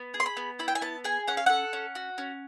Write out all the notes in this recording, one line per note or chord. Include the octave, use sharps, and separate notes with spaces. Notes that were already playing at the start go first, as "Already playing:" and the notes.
Already playing: B3
G#4
C6
B5
B3
E4 B5
G5
G#5
B3 A5
G#4 G#5
C#4 F#5
F5
A4 F#5
C#4
F#4
C#4